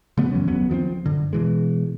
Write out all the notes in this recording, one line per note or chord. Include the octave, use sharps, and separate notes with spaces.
C#3 F3 A3 B3
F#2 E3 F#3 C#4
F#1 D#2 F#3 B3
D#3 F3 B3 C4
F#2 D3
B2 E3 G#3